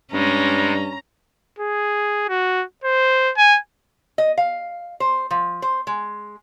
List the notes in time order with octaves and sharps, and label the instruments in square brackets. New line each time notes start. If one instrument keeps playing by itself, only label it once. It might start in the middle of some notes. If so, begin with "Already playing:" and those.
[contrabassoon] G2 [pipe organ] G3 G#3 [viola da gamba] C#4 [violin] A#5
[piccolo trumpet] G#4
F#4
C5
G#5
[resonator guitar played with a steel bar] D#5
F5
C5
F3
C5
G#3